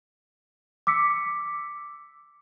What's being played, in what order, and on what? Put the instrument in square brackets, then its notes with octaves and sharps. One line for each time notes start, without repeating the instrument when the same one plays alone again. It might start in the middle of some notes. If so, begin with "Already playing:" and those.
[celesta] D6 E6 B6 C#7